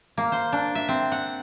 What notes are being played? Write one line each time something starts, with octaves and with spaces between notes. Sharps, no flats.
A#3
C5
D4
E5
C4
F#5